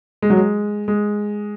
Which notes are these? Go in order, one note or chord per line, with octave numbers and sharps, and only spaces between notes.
G#3
F#3
G#3
G#3